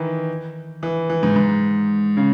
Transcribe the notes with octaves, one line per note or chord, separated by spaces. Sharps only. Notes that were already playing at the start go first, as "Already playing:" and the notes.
Already playing: D#3 E3
E3
E3
G#2
G#2
C#3